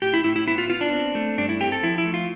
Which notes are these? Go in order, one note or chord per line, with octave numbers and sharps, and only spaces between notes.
A2 G4
E4
A2 E4
E4
B3 E4
F4
B3 F4
D4
C4
A3
G2 D4
E4
C4 G4
A4
F3 E4
E4
A3
F4